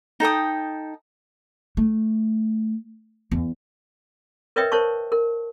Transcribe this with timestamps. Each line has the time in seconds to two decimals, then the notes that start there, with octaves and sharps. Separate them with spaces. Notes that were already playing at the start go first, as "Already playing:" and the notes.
0.20 D#4 A4 G5 D#6
1.77 A3
3.32 E2
4.56 A#4 B4 C#5 D#5 E5 G5
4.72 A#4 C5 C#5 A5 C#6
5.12 A#4